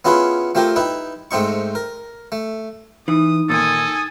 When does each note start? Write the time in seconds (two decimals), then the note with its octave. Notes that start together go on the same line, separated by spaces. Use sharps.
0.05 B3 C#4 E4 F4 G#4 B4
0.55 A3 C4 F4 G4 A#4
0.76 D#4 E4 B4
1.31 G#2 A3 C4 D#4 C#6
1.75 A#4
2.32 A3
3.08 E3 D#4 D#6
3.50 A#2 D#3 A4 G#5 D#6